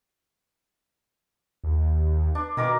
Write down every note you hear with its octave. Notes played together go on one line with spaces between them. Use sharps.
D#2
D4
B2 D#3 A#4 D6